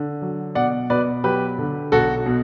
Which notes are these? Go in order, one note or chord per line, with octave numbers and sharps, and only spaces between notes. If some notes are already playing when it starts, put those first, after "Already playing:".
Already playing: D3
F#3
B2 D5 F#5
B2 B4 D5
F#3 G4 B4
D3
B1 F#4 A4
B2